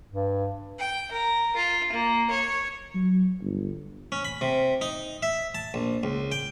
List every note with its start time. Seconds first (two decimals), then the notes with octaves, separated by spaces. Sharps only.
0.11 G2
0.79 G5
1.12 A#4
1.56 F4
1.93 A#3
2.30 C#5
2.94 F#3
3.41 G1
4.12 C#4
4.25 B5
4.41 C3
4.81 D#4
5.23 E5
5.55 A5
5.74 A#1
6.03 C#2
6.32 G5